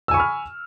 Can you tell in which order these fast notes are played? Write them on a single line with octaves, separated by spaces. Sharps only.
E6 G#5 C#6 B5 F6